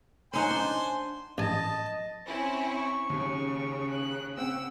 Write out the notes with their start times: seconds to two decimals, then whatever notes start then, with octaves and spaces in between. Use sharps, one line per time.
0.33 C#4 D#4 C5 F#5 G#5 C6
0.51 D4
1.38 A1 D#5 G#5 A5
2.26 C4 C#4 E4
2.66 C#6
3.10 D#2 C#3
3.90 F#6
4.37 C4 F#5 G5 E6